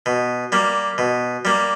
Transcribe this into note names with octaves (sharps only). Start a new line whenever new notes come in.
B2
G3 A#3
B2
G3 A#3